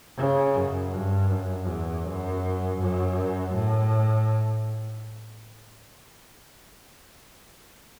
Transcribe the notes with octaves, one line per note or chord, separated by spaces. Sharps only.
C#3
F#2
G2
F#2
E2
F#2
F#2
A2